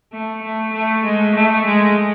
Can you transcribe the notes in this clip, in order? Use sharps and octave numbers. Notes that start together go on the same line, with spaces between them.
A3
A3
A3
G#3
A3
G#3